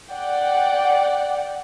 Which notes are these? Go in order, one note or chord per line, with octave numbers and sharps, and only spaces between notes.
D5 F#5 G5